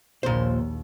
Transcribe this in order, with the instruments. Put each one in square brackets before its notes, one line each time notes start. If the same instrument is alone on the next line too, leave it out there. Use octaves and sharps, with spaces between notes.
[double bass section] A#1 D#2 [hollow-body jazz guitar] A#2 C5